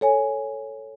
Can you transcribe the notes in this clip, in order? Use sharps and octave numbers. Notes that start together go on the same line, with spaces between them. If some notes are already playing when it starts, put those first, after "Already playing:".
A4 C#5 G#5